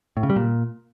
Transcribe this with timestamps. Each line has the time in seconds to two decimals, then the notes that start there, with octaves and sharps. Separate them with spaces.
0.17 A2
0.23 C#3
0.30 G3
0.36 A#2